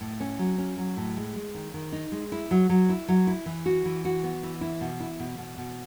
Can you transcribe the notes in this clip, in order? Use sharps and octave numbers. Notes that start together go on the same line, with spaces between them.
A2
C#4
F#3
C#4
F#3
A2
G#3
G#3
D#3
D#3
D#4
G#3
E4
F#3
F#3
E4
F#3
E4
E3
F#4
E3
F#4
B3
E3
E4
B2
E4
B2
B2
B2